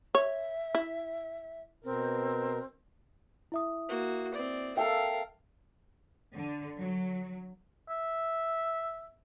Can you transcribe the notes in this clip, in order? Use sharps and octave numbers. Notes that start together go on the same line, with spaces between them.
C#5 E5
E4
B2 C4 A#4
E4 E5 D#6
A#3 F#4
C4 D5
A4 A#4 E5 F5 G5
D3
F#3
E5